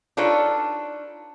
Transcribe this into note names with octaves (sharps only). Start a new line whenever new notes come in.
D4 D#4 F4 A4 B4 C#5